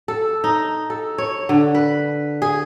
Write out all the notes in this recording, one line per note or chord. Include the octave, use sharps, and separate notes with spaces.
A4
D#4
A4
C#5
D3
B4
G#4